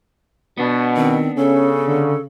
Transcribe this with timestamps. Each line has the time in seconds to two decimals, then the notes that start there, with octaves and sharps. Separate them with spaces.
0.57 B2 B3 D4
0.97 D#3 C4
1.37 C#3 C#4 A4
1.87 D3